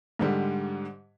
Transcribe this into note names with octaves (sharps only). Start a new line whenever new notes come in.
G#2 D3 G3